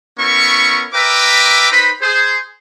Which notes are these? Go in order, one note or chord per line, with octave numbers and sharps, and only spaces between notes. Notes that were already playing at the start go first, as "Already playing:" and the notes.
B3 C#4 E4 A#4 C#6
A#4 B4 E5 G5 A#5 D6
D#4 B4 C5 B5
G#4 C5